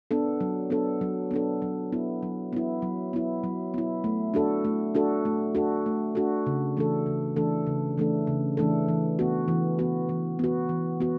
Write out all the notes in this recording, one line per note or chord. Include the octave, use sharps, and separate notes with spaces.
B3 D4 A4
F#3
B3 D4 A4
F#3
B3 D4 A4
F#3
B3 E4
F#3
B3 E4
F#3
B3 E4
F#3
B3 E4
A3
D4 F#4 A4
A3
D4 F#4 A4
A3
D4 F#4 A4
A3
D4 F#4 A4
C#3
E3 A3 D4 A4
C#3
E3 A3 D4 A4
C#3
E3 A3 D4 A4
C#3
E3 A3 D4 A4
E3
B3 F#4
E3
B3 F#4
E3
B3 F#4
E3
B3 F#4